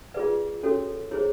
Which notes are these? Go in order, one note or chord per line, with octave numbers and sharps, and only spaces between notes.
F4 G#4 B4 D5
C#4 F#4 A4 C#5
E4 G#4 C5 C#5